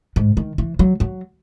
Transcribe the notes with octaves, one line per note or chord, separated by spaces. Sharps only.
G#2
D#3
E3
F#3
F#3